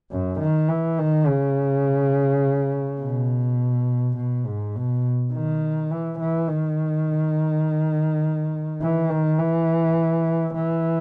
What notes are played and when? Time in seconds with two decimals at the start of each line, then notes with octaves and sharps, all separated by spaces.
0.11 F#2
0.40 D#3
0.69 E3
0.98 D#3
1.27 C#3
3.01 B2
4.17 B2
4.46 G#2
4.76 B2
5.33 D#3
5.91 E3
6.20 E3
6.48 D#3
8.82 E3
9.10 D#3
9.39 E3
10.55 E3